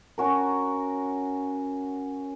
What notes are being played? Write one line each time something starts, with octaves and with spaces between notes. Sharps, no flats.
C#4 F#4 A#4